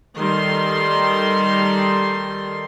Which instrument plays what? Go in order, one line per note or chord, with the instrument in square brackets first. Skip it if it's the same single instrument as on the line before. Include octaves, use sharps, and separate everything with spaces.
[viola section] D#3 G3 A4 C6